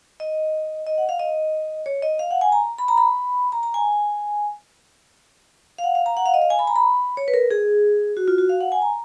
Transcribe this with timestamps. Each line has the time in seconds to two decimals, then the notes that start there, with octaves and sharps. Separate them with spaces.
0.20 D#5
0.87 D#5
0.98 F#5
1.09 F5
1.19 D#5
1.86 C#5
2.02 D#5
2.19 F5
2.31 F#5
2.41 G#5
2.52 A#5
2.78 B5
2.88 A#5
2.98 B5
3.52 A#5
3.63 A#5
3.74 G#5
5.78 F5
5.84 F#5
5.95 F5
6.06 A#5
6.17 F#5
6.26 F5
6.34 D#5
6.42 F5
6.50 G#5
6.59 B5
6.67 A#5
6.76 B5
7.17 C#5
7.28 B4
7.34 A#4
7.51 G#4
8.17 F#4
8.28 F4
8.38 F#4
8.49 F5
8.61 F#5
8.72 G#5
8.82 A#5